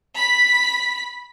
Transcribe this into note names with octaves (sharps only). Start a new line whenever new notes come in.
B5 B6